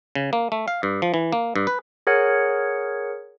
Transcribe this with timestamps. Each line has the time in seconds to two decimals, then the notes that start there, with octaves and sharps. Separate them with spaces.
0.15 C#3
0.33 A#3
0.52 A3
0.68 F5
0.83 G2
1.02 F3
1.14 E3
1.33 A#3
1.56 G2
1.67 B4
2.07 G#4 A#4 C#5 F#5